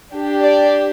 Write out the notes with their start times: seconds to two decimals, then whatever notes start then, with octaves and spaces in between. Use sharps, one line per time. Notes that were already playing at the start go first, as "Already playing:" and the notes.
0.13 D4 G4
0.42 D5